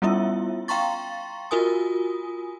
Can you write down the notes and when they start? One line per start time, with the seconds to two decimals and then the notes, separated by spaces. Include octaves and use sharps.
0.02 G3 B3 C#4 E4 F4 E5
0.68 F5 G5 A#5 C6 C#6 A6
1.51 F4 F#4 A#4 G#5 D#6